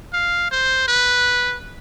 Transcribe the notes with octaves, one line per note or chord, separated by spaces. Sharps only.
F5
C5
B4